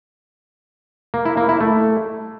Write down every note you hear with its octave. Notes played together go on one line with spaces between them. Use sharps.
A#3
E4
A#3
E4
A3